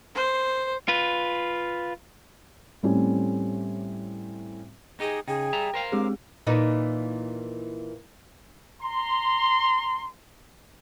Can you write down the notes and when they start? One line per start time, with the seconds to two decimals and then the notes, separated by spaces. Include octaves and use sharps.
0.15 C5
0.88 F4 B4
2.83 A2 G3 A3 C4 C#4
5.00 D#4 G4 G#4 D#5
5.28 C#3 D#4 G#4 G5
5.53 G3 E5 A#5
5.74 A#4 C5 F5
5.92 G#3 C4 G4 G#4 D6
6.47 A#2 E3 D#4
8.80 A#5 C6